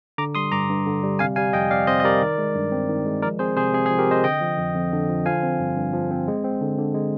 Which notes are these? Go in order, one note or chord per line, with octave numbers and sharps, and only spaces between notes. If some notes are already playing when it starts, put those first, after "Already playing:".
D3 A#5 D6
G3 C6 D#6
G2 A#5 D6
G2
D3
G3
C3 F5 G#5
G3 F5 G#5
F2 D#5 G5
C4 D5 F5
C3 C5 D#5
D#5
G3 A#4 D5
D#3
G#3
G2
C4
D#3
G#3
F3 A#4 D5
C4 G#4 C5
C3 G#4 C5
C3 G#4
G#4
F3
G4 A#4
C4 C5 D#5
D3 D#5 G5
F3
F2
F2
D3
F3
F3 F5 G#5
C4
G2
G2
F3
C4
G#3
C4
D3
D3
G#3